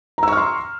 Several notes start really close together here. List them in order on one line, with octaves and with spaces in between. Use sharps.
A#5 E6 C#6 F6 C6